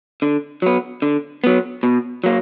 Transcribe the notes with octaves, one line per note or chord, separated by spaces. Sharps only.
D3
F#3 B3
D3
F#3 B3
B2
F#3 A#3